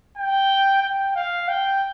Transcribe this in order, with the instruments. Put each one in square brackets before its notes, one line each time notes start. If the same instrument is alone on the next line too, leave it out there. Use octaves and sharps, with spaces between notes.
[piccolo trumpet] G5
G5
F5
G5